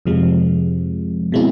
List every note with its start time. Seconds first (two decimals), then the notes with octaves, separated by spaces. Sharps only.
0.06 F2 C3 F3 G#3
1.32 B2 G#3 C4 E4